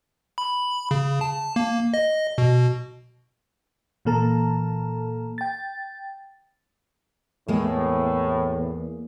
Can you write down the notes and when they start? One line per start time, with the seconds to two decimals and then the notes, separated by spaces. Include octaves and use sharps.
0.38 B5
0.91 C#3
1.21 A5
1.56 A#3
1.94 D#5
2.38 B2
4.05 A#2 E3 A#3 A4 A5 A#5
5.38 G5 A6
7.48 E2 A2 G#3 A#3